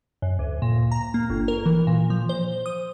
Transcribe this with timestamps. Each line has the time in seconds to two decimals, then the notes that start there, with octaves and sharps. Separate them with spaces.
0.22 F#2
0.39 D2
0.62 A#2
0.91 A#5
1.14 A#3
1.30 G1
1.48 A#4
1.66 E3
1.87 A#2
2.10 F3
2.29 C5
2.66 D#6